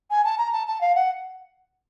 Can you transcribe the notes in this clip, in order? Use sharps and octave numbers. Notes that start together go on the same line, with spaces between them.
G#5
A5
A#5
A5
A5
F5
F#5